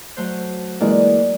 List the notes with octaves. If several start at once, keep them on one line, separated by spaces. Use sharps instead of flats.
F#3 A3 C5
E3 G#3 A#3 D5